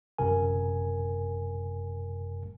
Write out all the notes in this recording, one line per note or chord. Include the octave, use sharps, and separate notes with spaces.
G1 F#2 C3 A#4 G#5